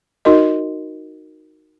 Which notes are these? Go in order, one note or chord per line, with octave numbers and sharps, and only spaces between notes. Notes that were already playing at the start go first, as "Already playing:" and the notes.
D#4 F#4 A#4 D#5